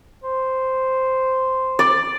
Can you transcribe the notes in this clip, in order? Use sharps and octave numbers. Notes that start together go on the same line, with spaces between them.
C5
D5